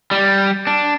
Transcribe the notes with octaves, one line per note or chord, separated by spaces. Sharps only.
G3
D4